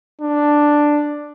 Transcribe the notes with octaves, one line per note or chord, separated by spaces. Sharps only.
D4